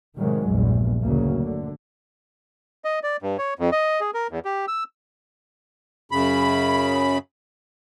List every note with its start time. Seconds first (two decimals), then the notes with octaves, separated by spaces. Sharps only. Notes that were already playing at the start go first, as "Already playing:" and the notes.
0.17 A2 C3 D#3 F#3 G#3
0.48 A#1 E2 G2
1.03 D2 C#3 F#3 A#3
1.44 D3
2.85 D#5
3.03 D5
3.22 G2
3.38 C#5
3.59 F2
3.72 D#5
4.01 G#4
4.14 A#4
4.30 E2
4.45 G4
4.68 E6
6.12 F#2 C#3 B5